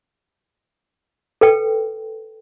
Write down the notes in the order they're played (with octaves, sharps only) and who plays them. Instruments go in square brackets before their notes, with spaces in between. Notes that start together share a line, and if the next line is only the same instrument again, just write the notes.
[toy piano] A4 B4 G5